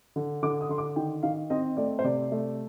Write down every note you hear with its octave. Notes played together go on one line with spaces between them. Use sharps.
D3
D3 D6
D#6
D3 C6
D6
D#3 G5
D#3 F5
C4 D#5
A3 D5
C5
C3 D5
A3